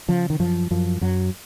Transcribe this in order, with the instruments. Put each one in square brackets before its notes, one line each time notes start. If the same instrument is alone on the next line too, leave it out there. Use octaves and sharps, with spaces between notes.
[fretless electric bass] C#3 F3
D#3
F#2 F3
F#2 F3
F#2 F#3